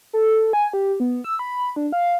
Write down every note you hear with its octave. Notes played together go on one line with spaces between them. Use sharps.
A4
G#5
G4
B3
E6
B5
D4
F5